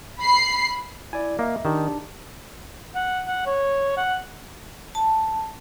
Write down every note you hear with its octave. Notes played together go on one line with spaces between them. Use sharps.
B5 C7
E4 D5 G#5
A#3 D#5 E5
D#3 D4 G4 A5
F#5
F#5
C#5
F#5
A5